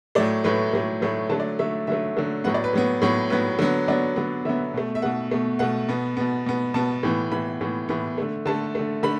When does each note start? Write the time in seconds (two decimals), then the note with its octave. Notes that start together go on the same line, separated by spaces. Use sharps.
0.15 A2 F#3 A3 D5
0.44 A2 F#3 A3 B4
0.73 A2 F#3 A3
1.02 A2 F#3 A3
1.30 D3 F#3 A3 A5
1.40 D5
1.59 D3 F#3 A3 E5
1.87 D3 F#3 A3 E5
2.17 D3 F#3 A3
2.44 A2 F#3 B3 F#5
2.54 D5
2.64 B4
2.73 A2 F#3 B3
3.02 A2 F#3 B3
3.30 A2 F#3 B3 B4
3.59 D3 F#3 B3
3.88 D3 F#3 B3 D5
4.16 D3 F#3 B3
4.45 D3 F#3 B3 E5
4.74 B2 A3
4.95 E5
5.02 B2 A3 F#5
5.31 B2 A3
5.59 B2 A3 F#5
5.88 B2 B3
6.17 B2 B3
6.46 B2 B3
6.74 B2 B3 A5
7.03 A2 E3 B3
7.32 A2 E3 B3 B5
7.61 A2 E3 B3
7.89 A2 E3 B3
8.18 D3 A3
8.46 D3 A3 A5
8.75 D3 A3
9.03 D3 A3 B5